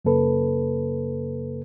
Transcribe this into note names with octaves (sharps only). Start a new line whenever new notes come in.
F#2 C#3 A#3 A4 B4